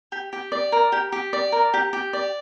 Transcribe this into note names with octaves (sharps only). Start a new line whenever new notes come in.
G4
G4
D5
A#4
G4
G4
D5
A#4
G4
G4
D5